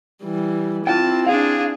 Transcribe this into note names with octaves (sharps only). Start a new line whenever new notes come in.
E3 G3
C4 E4 F4 G5 A5
D4 G#4 F5